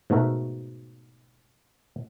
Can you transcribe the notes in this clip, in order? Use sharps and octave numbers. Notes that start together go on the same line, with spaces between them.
G#2 B2 A3 F#4 A#4 E5